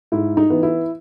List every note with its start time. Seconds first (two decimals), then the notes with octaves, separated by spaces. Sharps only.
0.12 G#2 E4
0.37 D#4
0.50 E3 B3
0.63 E4